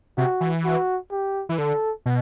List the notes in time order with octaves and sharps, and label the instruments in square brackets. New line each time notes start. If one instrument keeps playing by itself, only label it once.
[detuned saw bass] C3 [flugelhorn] F#4
[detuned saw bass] E3
[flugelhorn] F#4
G4
[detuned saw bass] E3
[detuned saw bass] D3 [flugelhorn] A4
[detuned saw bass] B2